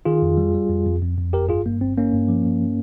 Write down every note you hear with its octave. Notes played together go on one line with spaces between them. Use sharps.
D#3 F4 G#4
F2
G3
G3
F2
F2
F2
F2
G1 G4 A#4
G2 F4 G#4
G2 A#3
G1 C4
G2 A#3 C#4
G2
F3
G2